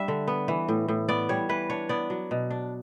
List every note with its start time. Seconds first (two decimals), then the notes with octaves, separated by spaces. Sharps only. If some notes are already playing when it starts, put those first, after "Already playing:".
Already playing: G3 D4 E5
0.08 D3
0.28 B3
0.48 E3
0.68 A2
0.88 A2
1.09 B3 D5
1.29 G3 C#5
1.49 E3 B4
1.70 D4 C#5
1.89 B3 D5
2.10 F#3
2.31 B2
2.51 D4